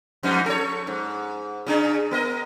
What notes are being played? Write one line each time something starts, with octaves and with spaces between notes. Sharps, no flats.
F2 G#2 D#4
A4 C#5
G#2
C#3 D4 G#4
B3 A#4 D#5